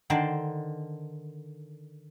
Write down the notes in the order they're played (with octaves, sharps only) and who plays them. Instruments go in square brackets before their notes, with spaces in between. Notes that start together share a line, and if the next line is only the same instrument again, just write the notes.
[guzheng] D3 D#3 C5 D5 A5